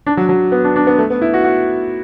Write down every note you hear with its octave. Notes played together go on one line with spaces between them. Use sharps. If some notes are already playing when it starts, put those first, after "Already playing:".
D4
F#3
F#3
B3
D4
D4
B3
A3
B3
E4
F#4
F#4